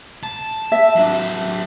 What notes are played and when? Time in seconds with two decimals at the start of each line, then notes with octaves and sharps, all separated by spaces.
0.23 A5
0.72 E5
0.96 F#3 D4